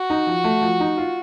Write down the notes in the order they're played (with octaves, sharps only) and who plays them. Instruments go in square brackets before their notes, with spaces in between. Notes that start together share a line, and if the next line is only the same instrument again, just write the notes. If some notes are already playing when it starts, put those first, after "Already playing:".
Already playing: [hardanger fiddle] F#4
[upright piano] D#4
F3
A3
F3
D#4
F4